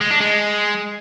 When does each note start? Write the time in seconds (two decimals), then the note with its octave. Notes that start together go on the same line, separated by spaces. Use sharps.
0.01 G#3
0.11 D4
0.20 G#3